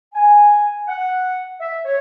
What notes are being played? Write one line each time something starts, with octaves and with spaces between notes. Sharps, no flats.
G#5
F#5
E5
C#5